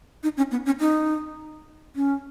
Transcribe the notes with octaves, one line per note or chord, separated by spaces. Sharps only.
D#4
C#4
B3
C#4
D#4
C#4